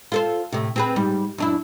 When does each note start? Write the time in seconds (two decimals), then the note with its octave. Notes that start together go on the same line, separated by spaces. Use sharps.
0.12 F4 A4 C5
0.52 A2 C3
0.76 C4 G#4 B4
0.96 G#2 G3
1.38 F#2 D4 E4